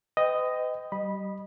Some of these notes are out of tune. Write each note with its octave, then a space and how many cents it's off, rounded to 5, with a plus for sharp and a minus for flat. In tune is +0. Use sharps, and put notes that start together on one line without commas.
B4 +45 D#5 +0 G5 +0
G3 -25 D#5 -25 B5 -10